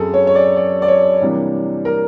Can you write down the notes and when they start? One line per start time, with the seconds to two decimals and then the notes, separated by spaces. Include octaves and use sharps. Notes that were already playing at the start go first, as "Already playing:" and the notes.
Already playing: F#2 F#3 C4 G#4 A4
0.14 C#5
0.27 C#5
0.35 D5
0.56 D5
0.82 D5
0.88 C#5
1.21 C3 E3 G3 A#3 D4
1.85 A#4